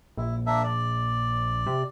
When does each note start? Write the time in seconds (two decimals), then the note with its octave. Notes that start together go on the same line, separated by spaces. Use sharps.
0.17 A#1 E4
0.46 A#3 D4 E5
0.63 D5
1.67 C3